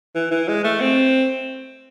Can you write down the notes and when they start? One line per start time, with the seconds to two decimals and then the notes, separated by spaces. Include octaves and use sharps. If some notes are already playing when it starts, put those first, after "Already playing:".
0.15 E3
0.31 E3
0.49 G#3
0.64 A3
0.80 C4